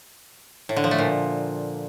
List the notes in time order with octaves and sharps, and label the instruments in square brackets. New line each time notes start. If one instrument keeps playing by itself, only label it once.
[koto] A2
D3
F3
A3
A#2